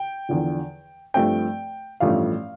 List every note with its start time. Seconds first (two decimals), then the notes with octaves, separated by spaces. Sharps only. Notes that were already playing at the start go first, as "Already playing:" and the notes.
Already playing: G5
0.29 E2 D3 F3
1.14 G2 F3 A3 C4 G5
2.00 A1 G2 F3 A3 F5